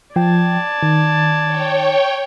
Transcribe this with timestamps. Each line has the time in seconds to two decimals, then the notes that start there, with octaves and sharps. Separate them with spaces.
0.16 F3 D5 G5 A5 G#6
0.83 D#3
1.46 C#5 G5